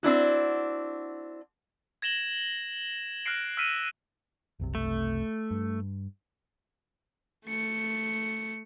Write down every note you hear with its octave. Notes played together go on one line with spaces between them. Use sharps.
C4 D4 E4 F#4
G#6 A#6 E7 F#7 G7
F6 F#6 A#6 C7 D7
E6 F6 B6 D#7 E7
F#1 C2 C3
A3
G2
A3 C#7